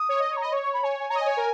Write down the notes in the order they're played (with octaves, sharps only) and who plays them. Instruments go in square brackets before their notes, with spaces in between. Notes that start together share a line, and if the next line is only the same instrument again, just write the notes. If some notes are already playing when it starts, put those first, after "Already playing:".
Already playing: [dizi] D#6
[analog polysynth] C#5
D#5
C#5
[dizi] A#5
[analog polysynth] D#5 [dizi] B5
[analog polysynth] C#5 [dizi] C#6
[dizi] C#6
B5
[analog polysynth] C#5 [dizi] G#5
[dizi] G#5
[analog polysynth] C#5 [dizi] A#5
[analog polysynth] D#5 [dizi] G#5
[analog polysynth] C#5
A#4